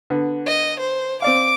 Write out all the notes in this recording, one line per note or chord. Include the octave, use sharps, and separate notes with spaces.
D3 B3
D#5
C5
C4 D5 F5 D6